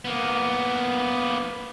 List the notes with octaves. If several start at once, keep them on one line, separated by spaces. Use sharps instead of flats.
A#3 B3